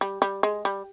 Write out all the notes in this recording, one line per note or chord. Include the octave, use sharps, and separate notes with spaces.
G3
G3
G#3
G3